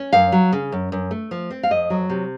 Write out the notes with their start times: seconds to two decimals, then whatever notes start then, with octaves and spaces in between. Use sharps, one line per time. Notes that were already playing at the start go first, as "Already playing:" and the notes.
Already playing: C#4
0.13 F#2 F5
0.32 F#3
0.52 C#3
0.72 F#2
0.92 F#2
1.11 A3
1.31 F3
1.50 C4
1.63 F5
1.71 F2 D#5
1.90 F#3
2.10 C3